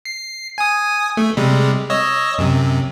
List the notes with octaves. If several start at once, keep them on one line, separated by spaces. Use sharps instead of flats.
C7
G#5 D#6
A3
C3 G3 G#3
C#5 D#5 E6
F#2 C3